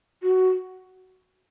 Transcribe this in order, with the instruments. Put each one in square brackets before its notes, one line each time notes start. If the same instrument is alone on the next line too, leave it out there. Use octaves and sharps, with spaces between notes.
[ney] F#4